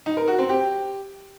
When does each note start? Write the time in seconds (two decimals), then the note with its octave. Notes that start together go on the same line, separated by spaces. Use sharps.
0.06 D#4
0.17 A#4
0.28 F#4
0.38 C4
0.49 G4